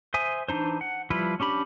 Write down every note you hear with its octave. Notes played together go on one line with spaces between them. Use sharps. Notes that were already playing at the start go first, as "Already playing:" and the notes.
C5 E5 G#5 D#6
E3 D4 D#4 C5
F#5
F3 G3 E4 F4 B4
C#4 D4 G4 B5